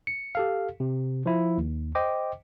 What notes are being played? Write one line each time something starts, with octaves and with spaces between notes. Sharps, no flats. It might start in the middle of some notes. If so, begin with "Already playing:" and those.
C#7
G4 A4 F5
C3
F3 E4
D#2
C5 D#5 G5 D6